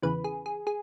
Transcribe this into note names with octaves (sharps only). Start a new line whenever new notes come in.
E2 C#3 E3 B4
G#4
G#4
G#4